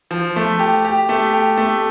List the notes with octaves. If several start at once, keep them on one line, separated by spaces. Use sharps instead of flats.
F3
A3
G4
G4
A3
G4
A3